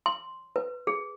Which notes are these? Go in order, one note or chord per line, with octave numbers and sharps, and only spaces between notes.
C6
B4
G#4